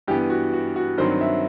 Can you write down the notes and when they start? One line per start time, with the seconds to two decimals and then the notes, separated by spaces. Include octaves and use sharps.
0.07 G2 E3 B3 G4
0.30 F#4
0.53 F#4
0.76 F#4
0.98 G2 D#3 F#3 C4 C5
1.21 E5